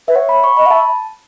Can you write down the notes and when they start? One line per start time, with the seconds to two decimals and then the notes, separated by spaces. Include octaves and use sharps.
0.08 B4 E5
0.15 C#5 F#5
0.29 B5
0.44 C#6
0.57 D#5 B5
0.66 F#5
0.70 E5 A5